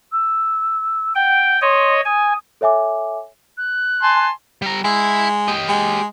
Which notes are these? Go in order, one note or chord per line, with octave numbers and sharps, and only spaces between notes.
E6
F#5 G5
C#5 D#5 C6
G#5 D#6
A4 C#5 E5 G#5 D6
F#6
G#5 A5 C6
G3 A#5
G#3 E4
G4 D#5
G#3